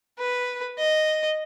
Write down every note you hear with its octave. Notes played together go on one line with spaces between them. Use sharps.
B4
D#5